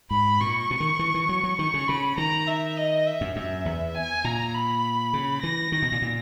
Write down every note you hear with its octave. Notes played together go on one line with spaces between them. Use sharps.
G#2 B5
A#2 C#6
B2
D#3
E3
E3
F#3
F#3
D#3 C#6
C#3
C#3 B5
D#3 A#5
E5
D#5
E5
F#2
F#2 E5
E2
G#5
A#2 A#5
B5
C#3
E3 A#6
D#3
B2
A#2
A#2